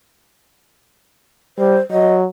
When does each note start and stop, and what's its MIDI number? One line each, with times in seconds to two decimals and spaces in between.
1.58 1.79 55
1.58 1.80 72
1.91 2.26 54
1.91 2.14 75